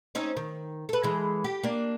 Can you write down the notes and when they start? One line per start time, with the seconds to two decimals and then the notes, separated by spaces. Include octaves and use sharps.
0.15 C4 C#4 D#4
0.37 D#3
0.89 A4 B4
1.04 E3 G#3
1.44 G4
1.63 A#3 D4